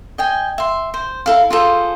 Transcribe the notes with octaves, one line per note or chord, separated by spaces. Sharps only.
D#5 G5 G#5
E5 C6
C5
E4 A4 F5
F4 G#4 A4 C5